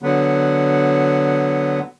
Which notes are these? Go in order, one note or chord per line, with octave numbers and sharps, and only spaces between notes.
D3 F#3 B3